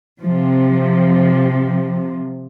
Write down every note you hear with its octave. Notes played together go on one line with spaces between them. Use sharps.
C3 F3